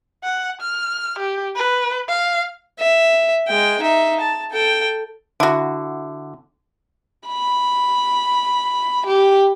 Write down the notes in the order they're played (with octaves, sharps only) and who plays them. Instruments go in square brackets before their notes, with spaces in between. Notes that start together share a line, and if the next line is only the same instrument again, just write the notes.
[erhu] F#5
F6
G4
B4
F5
[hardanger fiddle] E5
G#3 G5
D#4 E5
A5
A4 G5
[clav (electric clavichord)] D3 [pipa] E4 F#4
[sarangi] B5
G4